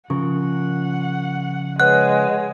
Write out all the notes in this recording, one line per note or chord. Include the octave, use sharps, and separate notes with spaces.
C#3 F3 A#4 F#5 C#6
G#3 B4 C#5 F#5 F#6